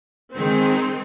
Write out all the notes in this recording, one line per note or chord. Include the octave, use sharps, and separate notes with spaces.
D#3 G#3 C4